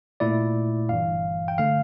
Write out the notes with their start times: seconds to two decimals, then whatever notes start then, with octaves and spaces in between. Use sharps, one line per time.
0.20 A#2 A3 E4 D5
0.89 G1 G2 E3 F5
1.48 G5
1.58 D3 A3 F5